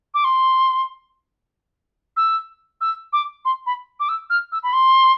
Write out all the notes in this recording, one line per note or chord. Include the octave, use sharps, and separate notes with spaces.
D6
C6
E6
E6
D6
C6
B5
D6
E6
F6
E6
B5
C6